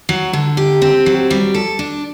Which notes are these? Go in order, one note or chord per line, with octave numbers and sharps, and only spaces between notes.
F#3
D3
G4
C4
F#3
G3
A4
D4